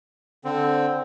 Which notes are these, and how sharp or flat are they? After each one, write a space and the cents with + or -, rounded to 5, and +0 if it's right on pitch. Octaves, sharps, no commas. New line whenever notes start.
D3 +0 C4 +0